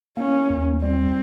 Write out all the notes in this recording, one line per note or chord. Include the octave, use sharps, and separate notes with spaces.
A#3 C#4
D#2
G3 C4